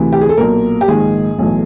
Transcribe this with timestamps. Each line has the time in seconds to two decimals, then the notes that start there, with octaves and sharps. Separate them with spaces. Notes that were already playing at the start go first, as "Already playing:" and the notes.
Already playing: D2 C3 E3
0.13 G4
0.21 G#4
0.29 A4
0.37 B1 A#2 A#4
0.81 G4
0.88 A#1 G#2 D#3 G#4
1.39 B1 A2 E3